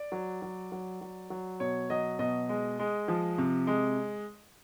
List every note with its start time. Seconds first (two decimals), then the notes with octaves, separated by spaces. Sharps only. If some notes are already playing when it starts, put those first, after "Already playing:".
Already playing: D5
0.12 F#3
0.42 F#3
0.72 F#3
1.01 F#3
1.30 F#3
1.60 B2 C#5
1.90 F#3 D#5
2.19 B2 D#5
2.49 G#3
2.79 G#3
3.08 F3
3.38 C3
3.67 G#3